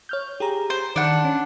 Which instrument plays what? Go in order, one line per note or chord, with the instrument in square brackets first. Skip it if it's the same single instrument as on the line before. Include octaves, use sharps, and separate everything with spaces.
[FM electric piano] C#5 F6 G6
G4 G#4 A#5
[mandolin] C5
[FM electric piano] D#3 [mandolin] D4 F#5
[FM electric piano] C#4